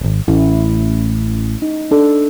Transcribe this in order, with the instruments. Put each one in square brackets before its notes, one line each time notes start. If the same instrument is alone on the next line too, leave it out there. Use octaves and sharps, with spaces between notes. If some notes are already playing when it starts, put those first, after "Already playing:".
[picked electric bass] D1 G#1
[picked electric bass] A1 [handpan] A3 C#4 E4
[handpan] D#4
D4 A4